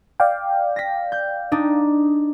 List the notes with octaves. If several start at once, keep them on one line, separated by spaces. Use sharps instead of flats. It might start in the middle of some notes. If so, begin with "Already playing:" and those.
D5 F5 G5
A#6 B6
G6
D4 D#4